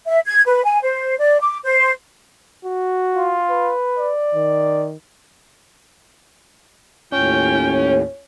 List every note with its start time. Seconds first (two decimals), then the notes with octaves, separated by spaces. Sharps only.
0.07 E5
0.26 G#6
0.46 B4
0.64 G#5
0.83 C5
1.19 D5
1.41 D6
1.64 C5
2.65 F#4
3.16 F4
3.50 B4
3.99 D5
4.35 D#3
7.12 D#2 A2 C#4 F4 G5